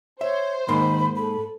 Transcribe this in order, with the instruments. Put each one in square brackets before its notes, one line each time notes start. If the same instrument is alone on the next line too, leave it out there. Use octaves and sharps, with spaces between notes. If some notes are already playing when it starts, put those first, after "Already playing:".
[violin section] C5 [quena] C#5 [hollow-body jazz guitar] E5
[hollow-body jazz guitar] G#2 A#3 C6 [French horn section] D#3 [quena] B5
[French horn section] A4 [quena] B5